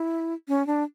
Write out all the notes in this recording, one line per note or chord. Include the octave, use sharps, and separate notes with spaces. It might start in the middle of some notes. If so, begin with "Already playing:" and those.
Already playing: E4
C#4
D4